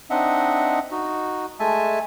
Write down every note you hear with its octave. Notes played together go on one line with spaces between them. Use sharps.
C4 D4 D#4 D#5 E5 F#5
D#4 F#4
G#3 A3 E5 G#5 A5